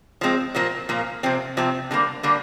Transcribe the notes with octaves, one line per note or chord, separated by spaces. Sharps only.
F3 G#3 C4
A#2 F3 A#3
A#2 F3 A#3
C3 F3 C4
C3 F3 C4
D3 G3 A#3
D3 G3 A#3